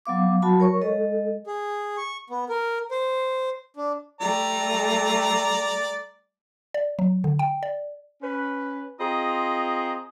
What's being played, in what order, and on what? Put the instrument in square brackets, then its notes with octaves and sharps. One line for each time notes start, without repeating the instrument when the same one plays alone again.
[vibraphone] F#3 B3 F5 D6
F#3 F#4 A5 B5
A#4 C#5 C#6
G#3 A4 D#5
[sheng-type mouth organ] G#4
C#6
B3
A#4
C5
D4
[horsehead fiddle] G3 A3 [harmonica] D5 A#5
[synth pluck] D5
F#3
D3
G5
D5
[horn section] C#4 B4
C4 F4 G#4 D#5 A#5 C6